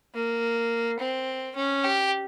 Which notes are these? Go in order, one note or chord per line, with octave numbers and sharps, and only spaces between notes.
A#3
C4
C#4
G4